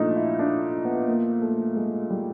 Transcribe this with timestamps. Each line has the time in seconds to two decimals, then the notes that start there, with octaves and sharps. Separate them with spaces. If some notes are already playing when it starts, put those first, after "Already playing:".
Already playing: A#2 F3 A3 D4 D#4
0.16 E4
0.39 D4
0.85 B3
1.08 A#3
1.42 A3
1.76 G#3
2.10 G3